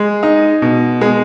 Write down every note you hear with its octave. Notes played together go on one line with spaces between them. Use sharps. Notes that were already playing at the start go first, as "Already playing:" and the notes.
Already playing: G#3
D#4
B2
G#3